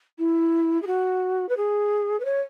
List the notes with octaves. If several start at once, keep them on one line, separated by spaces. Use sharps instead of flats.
E4
G#4
F#4
B4
G#4
B4
C#5